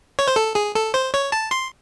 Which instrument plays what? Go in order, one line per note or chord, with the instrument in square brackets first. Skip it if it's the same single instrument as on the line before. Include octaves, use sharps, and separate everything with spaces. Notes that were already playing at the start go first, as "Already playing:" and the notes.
[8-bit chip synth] C#5
C5
A4
G#4
A4
C5
C#5
A5
C6